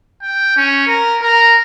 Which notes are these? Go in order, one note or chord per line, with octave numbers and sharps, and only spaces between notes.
G5
C#4
A#4
A#4